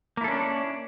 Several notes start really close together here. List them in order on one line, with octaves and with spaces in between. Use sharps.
A#3 E4 A4 C#4 D4